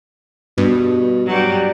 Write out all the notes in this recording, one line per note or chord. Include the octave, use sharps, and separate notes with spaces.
G2 B2
F#3 G3